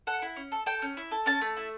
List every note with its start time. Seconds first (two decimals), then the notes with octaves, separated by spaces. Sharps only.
0.07 A4 F#5
0.22 E4
0.36 C#4
0.52 A4
0.66 A4 G5
0.82 C#4
0.97 E4
1.12 A4
1.26 C#4 A5
1.41 A3
1.57 E4